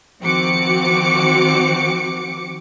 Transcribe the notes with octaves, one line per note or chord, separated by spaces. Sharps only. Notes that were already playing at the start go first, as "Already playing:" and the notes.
D#3 F3 C4 F#4 D6 C#7